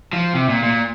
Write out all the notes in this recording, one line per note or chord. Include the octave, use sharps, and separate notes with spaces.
F3
C3
A#2
A#2